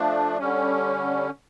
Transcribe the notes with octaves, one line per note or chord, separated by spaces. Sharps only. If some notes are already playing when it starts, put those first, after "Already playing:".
Already playing: F3 A3 D4
D3 G3 C#4